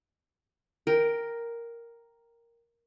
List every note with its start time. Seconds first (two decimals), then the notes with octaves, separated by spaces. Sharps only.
0.87 A#4 G5